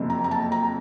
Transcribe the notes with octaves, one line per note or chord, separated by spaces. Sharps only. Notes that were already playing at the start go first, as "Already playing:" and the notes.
Already playing: F#1 F2 C3
A#5
A#5
A5
A#5